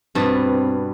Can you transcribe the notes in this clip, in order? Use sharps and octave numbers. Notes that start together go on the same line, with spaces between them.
G2 B2 C4 A5